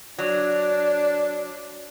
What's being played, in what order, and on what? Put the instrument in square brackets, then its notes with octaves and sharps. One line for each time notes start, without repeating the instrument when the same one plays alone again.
[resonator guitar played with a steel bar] F#3 [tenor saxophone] D4